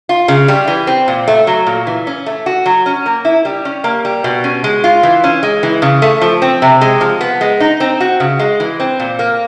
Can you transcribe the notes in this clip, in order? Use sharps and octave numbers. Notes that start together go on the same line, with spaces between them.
F4
C#3
G3
E3
C4
A#2
A3
F#3
A#2
E3
C#4
A3
F#4
F#3
C#4
A#3
E4
G3
C#4
A#3
G3
B2
C#4
G#3
F4
E3
C#4
G#3
E3
C#3
A3
F3
C4
C3
G#3
F3
B3
G#3
D#4
C4
F#4
C#3
G#3
E3
C4
A#2
A#3